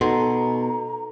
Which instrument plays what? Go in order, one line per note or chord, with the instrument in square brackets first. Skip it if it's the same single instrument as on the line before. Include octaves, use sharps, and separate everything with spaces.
[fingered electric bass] B2 [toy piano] D#4 F#5 C6 [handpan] A4 [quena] A#5